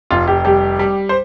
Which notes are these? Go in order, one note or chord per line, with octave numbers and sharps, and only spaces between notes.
F1 F4
G4
G3 G4
G3
C5